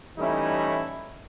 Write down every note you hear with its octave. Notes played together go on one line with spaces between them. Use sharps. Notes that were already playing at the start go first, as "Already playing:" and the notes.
E3 G3 A3 C#4 D#4 E4